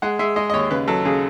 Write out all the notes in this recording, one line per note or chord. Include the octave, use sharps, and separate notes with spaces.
G#3 F#5
G#3 E5
G#3 D#5
D#5
D#2 C#5
C#3 B4
F#3 A4
C#3 G#4